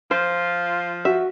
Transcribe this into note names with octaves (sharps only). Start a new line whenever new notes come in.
F3 F4 C5
F#4 E5